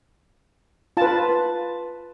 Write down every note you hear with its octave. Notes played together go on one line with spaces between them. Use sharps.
F4 B4 A5